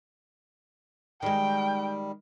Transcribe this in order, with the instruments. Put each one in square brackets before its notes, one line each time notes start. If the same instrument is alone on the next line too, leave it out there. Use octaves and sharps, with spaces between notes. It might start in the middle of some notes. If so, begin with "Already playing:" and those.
[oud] D#3 G#3 [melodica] G3 [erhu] G5